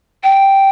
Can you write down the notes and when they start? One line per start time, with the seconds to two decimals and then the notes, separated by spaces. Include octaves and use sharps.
0.23 G5